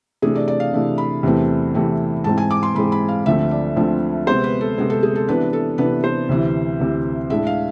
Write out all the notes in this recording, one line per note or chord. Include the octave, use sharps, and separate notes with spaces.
C3 E3 A3 D4 G#4
D5
D5
F5
C3 E3 A3 D4
B5
E2 C3 E3 A3 C4
E2 C3 E3 A3 C4
G#2 E3 G#3 C4 A5
G#5
D6
C6
G#2 E3 G#3 C4 B5
B5
F5
D2 D3 F3 A3 C4 E5
D5
D2 D3 F3 A3 C4
C3 G#3 B3 C5
B4
A4
C3 G#3 B3 G#4
A4
G#4
A4
C3 E3 B3 D4 B4
A4
C3 E3 B3 D4 B4
C5
D2 C3 E3
D2 C3 E3
A2 G#3 D4 E5
F5